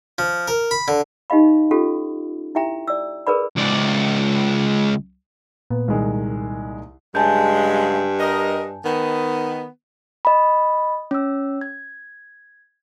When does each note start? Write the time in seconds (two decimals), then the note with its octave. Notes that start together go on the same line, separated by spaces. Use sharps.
0.18 F3
0.48 A#4
0.71 B5
0.88 D3
1.30 D#4 G4 D#5 F5 B5
1.71 C#4 F4 G4 A4
2.55 E4 G4 E5 G5 A#5
2.88 D5 E6
3.27 G#4 A#4 B4 D5 B5
3.56 C#2 D5
5.71 A#2 B3
5.88 C2 D#3 G#3
7.15 G2 C#3 F#3 G#3 G#5 A5 G6
8.20 A#4 D#5
8.84 D#3 B3
10.25 D#5 B5
11.11 C#4 E6
11.61 G#6